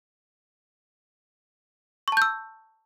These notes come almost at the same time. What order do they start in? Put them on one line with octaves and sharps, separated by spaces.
C#6 A5 G6 E6